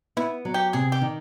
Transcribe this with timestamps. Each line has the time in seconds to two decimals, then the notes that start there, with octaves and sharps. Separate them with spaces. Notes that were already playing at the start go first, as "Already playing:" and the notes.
0.17 B3 E4
0.45 F#3
0.54 G4
0.73 C3 G#4
0.92 G4
1.01 D#3